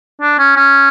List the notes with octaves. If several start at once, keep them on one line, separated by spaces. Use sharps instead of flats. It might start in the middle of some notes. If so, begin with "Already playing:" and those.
D4
C#4
C#4